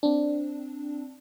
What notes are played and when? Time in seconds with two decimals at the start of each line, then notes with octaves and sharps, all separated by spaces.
0.03 C4 D4